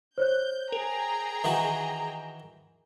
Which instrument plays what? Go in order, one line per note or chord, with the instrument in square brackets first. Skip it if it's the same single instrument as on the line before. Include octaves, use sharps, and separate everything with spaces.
[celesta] C5 C#5 F#6 [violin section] G6
[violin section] G#4 G5 A#5 [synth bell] A#4 F7
[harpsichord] D#3 E3 F#4